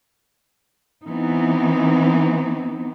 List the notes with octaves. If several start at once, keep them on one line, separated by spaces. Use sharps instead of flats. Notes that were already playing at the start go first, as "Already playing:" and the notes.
E3 B3 C4 D#4